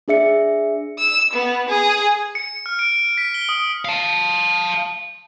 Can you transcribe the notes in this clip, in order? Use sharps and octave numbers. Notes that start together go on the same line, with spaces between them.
D4 G#4 E5 C#7
E6
B3
G#4
C#7
F6
D7
D7
B6
G7
D#6
F5 A5